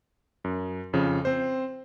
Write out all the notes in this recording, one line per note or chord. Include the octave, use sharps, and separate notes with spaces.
F#2
F2 C#3 F3
C4 C5